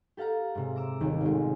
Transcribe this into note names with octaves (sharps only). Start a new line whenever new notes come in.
G4 A4 F5 F#5 A#5
G#2 C3
A#5 D6 E6
D#1 D#2 D#3
A1 G#3